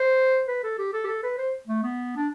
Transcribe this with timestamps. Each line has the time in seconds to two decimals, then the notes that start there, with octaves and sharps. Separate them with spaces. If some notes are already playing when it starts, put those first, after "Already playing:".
Already playing: C5
0.48 B4
0.63 A4
0.78 G4
0.93 A4
1.04 G4
1.07 A4
1.23 B4
1.38 C5
1.67 A3
1.83 B3
2.16 D4